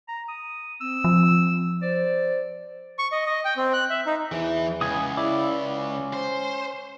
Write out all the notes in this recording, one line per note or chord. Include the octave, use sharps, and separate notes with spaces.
A#5
D#6
C4 E6
F3
C5 D5
C#6
D#5
D#5
G5
C4
F#6
E5
D#4
E2 E3
C#2 G#5 D#6
E4 D5
C#4
C5